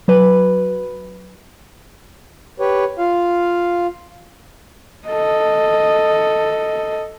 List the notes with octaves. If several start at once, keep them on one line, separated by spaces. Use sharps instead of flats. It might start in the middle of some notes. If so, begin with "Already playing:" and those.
F#3 B4
G4 B4 C#5
F4 F5
A4 D#5